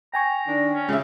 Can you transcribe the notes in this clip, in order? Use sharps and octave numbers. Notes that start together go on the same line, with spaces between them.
G5 G#5 A#5 C#6
D#3 D4
C#4
C#3 G#3 F4 G4 G#4 E5